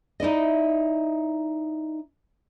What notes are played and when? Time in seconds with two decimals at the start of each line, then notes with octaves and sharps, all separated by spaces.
0.20 D#4 E4 D5 D#5